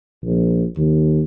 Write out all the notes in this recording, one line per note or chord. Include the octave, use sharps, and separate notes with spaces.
A#1
D#2